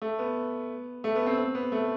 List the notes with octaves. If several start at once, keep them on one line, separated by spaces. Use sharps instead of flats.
A3
B3
A3
B3
C4
C4
B3
A3